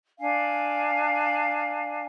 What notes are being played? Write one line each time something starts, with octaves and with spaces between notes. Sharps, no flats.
D4 F5 G#5